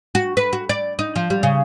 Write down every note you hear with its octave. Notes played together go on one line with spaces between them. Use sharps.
F#4
B4
F#4
D5
D#4
F3
G3
C#3